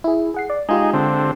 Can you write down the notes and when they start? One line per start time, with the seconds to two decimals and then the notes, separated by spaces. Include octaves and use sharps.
0.04 E4 G#4
0.34 G#4 F#5 C7
0.50 D5
0.69 G#3 D#4 F4 G4 G#4
0.93 D3 C4